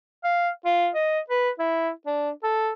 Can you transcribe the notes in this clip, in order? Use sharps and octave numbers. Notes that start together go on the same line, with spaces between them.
F5
F4
D#5
B4
E4
D4
A4